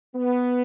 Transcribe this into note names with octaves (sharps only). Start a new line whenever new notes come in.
B3